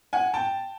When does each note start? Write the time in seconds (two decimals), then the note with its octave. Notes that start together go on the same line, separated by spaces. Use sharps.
0.13 F#5 G#5
0.34 G5 A5